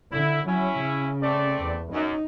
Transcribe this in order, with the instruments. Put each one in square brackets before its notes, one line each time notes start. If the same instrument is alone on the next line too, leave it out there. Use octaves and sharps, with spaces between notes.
[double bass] D3 [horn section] E4
[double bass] F#3 [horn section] C#4 E4
[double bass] C#3
[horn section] A3 C4 D5
[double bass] E2
[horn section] F#2 [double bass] D#4